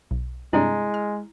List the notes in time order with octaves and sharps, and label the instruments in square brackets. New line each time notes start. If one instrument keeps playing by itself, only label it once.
[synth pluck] B1
[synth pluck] G2 C3 D4 [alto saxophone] G#3 [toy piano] E4
[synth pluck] F6